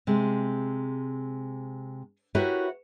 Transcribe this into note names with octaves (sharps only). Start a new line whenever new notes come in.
C3 G#3
E4 F#4 G4 A#4 B4 C#5